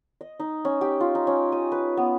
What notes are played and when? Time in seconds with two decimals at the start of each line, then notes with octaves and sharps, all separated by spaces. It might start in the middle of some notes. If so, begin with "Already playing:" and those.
0.21 D#5
0.40 D#4
0.65 C#4
0.81 G4
1.00 F4
1.15 D#4
1.27 C#4
1.52 D#6
1.72 B4
1.97 B3